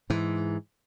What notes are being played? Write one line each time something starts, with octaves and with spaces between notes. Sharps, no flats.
G#2 E3